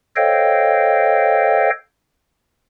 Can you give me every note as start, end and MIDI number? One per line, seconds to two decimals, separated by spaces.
0.16 1.70 69
0.16 1.70 72
0.16 1.70 73
0.16 1.70 75
0.16 1.70 77
0.16 1.70 79